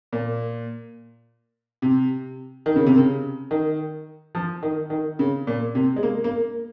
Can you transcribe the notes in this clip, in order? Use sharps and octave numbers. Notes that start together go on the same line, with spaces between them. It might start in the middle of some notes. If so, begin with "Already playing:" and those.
A#2
C3
D#3
C#3
C3
C#3
D#3
F3
D#3
D#3
C#3
A#2
C3
G#3
A#3
A#3